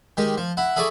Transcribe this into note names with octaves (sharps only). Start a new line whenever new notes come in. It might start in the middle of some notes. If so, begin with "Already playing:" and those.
D#3 G#3 G4
F3
E4 F#5
E4 G#4 A4 D5 C#6 D6